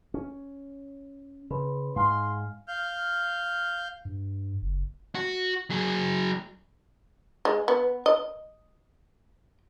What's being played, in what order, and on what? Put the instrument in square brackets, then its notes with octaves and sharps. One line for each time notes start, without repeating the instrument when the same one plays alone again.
[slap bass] C#4
[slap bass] C#3 [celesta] B4 B5 C6
[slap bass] G#2 [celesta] F5 G#5 F6 [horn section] C6
[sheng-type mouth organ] F5 F6 G6
[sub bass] G2
F#1
[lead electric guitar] F#4
F#3 G#4
[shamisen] G#3
B3
D#5